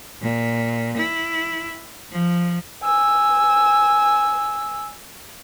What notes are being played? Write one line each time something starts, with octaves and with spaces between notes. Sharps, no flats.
A#2
E4
F3
G#5 E6